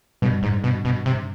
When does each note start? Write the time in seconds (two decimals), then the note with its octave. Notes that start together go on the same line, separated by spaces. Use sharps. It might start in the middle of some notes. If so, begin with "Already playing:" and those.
0.22 G2 B2
0.43 G#2
0.64 B2
0.85 B2
1.06 C3